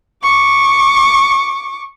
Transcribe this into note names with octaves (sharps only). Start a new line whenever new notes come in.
C#6 D6